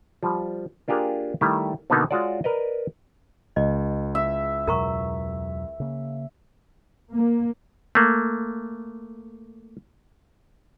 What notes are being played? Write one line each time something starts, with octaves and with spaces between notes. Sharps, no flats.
F3 G3
A#3 D4 F4 G4 G#4 A#4
D#3 G3 A3 E4
B2 D3 A#3 B3 D#4 F#4
G#3 F4 F#4 C#5 D5
A#4 B4 D5 D#5
C#2 D#5
E5
E2 B2 F#3 A#4 A#5 C#6
C#3 A#3
A#3
A3 A#3